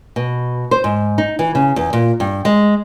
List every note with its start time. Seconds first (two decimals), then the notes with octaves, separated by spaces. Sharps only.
0.16 B2
0.71 C5
0.84 G#2
1.18 D#4
1.39 E3
1.55 C#3
1.76 E2
1.93 A#2
2.20 G2
2.45 G#3